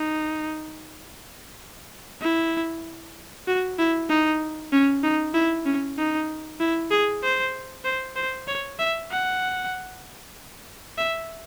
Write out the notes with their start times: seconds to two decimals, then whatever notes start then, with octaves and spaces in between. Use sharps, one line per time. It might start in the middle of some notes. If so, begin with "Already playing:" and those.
Already playing: D#4
2.21 E4
3.47 F#4
3.78 E4
4.09 D#4
4.73 C#4
5.03 D#4
5.34 E4
5.65 C#4
5.98 D#4
6.60 E4
6.91 G#4
7.23 C5
7.85 C5
8.16 C5
8.47 C#5
8.79 E5
9.11 F#5
10.98 E5